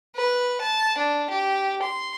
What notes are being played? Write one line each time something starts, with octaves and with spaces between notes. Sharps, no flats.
B4
A5
D4
G4
C6